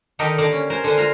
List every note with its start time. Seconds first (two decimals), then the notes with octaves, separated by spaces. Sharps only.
0.19 D3 D#3 D#4 G4 A4 A#4
0.38 D3 A#3 D5 A5 A#5
0.52 C#4
0.70 A#4 C5 G#5
0.84 D3 D4 C5 G#5
0.97 F4 F5 G#5 A#5